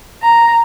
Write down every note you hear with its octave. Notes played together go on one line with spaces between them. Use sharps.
A#5